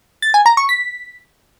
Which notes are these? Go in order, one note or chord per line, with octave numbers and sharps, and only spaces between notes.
A6
G#5
A#5
C#6
B6